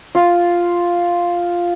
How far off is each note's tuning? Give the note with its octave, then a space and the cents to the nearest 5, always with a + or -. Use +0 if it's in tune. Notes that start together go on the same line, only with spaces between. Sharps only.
F4 +0